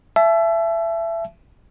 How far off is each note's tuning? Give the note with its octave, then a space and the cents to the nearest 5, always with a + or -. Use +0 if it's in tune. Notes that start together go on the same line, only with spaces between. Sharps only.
E5 +25 A5 -35